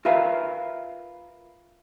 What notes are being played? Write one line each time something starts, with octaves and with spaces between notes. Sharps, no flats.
F4 A#4 B4 E5 F5